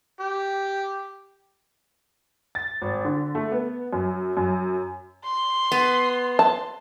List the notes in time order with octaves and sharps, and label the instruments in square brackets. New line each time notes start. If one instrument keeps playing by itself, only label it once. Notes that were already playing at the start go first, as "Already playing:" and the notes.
[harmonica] G4
[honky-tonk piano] A6
G#1
D3
A3
B3
F#2
F#2
[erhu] C6
[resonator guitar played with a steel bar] B3
[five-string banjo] A5